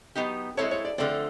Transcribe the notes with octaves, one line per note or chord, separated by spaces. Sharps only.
F#3 B3 D#4 G4
G#3 C4 E4 A4 C#5
C#5
D5
D3 F3 A3 C4 D5